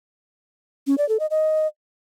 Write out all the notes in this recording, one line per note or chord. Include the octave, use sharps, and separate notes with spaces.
C#4
D5
A4
D#5
D#5